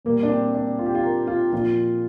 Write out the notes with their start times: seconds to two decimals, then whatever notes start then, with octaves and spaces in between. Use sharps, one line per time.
0.05 A#2 G3 A#3
0.23 D4
0.30 C4
0.55 D4
0.78 F4
0.86 G4
0.95 F4
1.03 A#4
1.27 F4
1.52 A#2 F3 F4